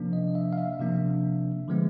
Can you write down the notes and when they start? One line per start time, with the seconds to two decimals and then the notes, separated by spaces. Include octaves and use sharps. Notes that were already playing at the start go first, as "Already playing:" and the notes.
Already playing: C3 F3 A#3 D4
0.13 D#5
0.35 E5
0.53 F5
0.58 E5
0.79 C3 F3 A#3 D4
1.68 D3 F3 G#3 B3